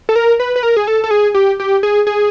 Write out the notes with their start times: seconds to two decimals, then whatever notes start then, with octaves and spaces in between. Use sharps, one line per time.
0.09 A4
0.16 A#4
0.40 B4
0.56 B4
0.63 A#4
0.77 G#4
0.87 A4
1.04 A4
1.11 G#4
1.34 G4
1.60 G4
1.83 G#4
2.07 G#4